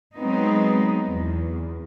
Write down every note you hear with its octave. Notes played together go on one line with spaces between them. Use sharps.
F#3 G#3 B3 C4 D#4
E2